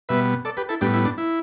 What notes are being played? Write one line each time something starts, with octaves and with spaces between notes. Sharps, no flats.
B2 G3 B3 B4 E5
A4 D5
G4 B4
E4 A4
A2 G3 B3 D4 G4
E4
D4
E4